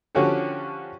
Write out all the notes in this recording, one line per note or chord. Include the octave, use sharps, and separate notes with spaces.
D3 F3 C#4 F#4 G4 A4